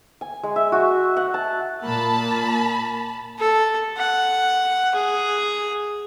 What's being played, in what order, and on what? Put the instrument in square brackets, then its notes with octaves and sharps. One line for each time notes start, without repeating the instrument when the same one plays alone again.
[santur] G#5
G#3
E5
F#4
F#5
A5
[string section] A#2 A#3 [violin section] A5 B5
[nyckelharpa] A4
F#5
G#4